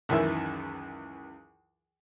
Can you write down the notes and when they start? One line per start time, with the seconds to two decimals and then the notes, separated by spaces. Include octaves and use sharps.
0.09 C#2 F#2 D#3 E3 E5